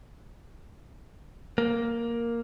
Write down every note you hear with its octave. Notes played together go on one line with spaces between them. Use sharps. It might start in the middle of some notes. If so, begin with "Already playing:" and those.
A#3